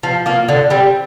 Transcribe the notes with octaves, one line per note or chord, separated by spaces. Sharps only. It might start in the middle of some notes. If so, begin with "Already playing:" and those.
F3
A#3 F4
D3
G3 C4